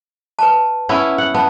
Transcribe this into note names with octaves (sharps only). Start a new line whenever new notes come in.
B4 A5
B3 C#4 E4
F#5
B3 A5